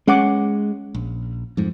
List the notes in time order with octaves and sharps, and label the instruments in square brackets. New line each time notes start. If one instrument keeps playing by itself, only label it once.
[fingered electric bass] G#3 [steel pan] C#4 F#5 D6
[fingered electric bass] A#1
F2 G#2